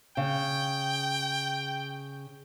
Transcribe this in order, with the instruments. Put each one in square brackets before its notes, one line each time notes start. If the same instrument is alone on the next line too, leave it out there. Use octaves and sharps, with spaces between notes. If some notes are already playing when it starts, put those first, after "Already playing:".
[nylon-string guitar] C#3 [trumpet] G5